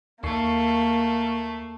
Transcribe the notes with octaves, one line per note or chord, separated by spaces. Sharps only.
D#2 A3 A#3 C#6 C7